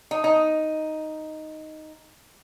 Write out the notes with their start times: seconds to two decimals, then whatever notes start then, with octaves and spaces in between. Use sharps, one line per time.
0.11 D#4
0.24 D#4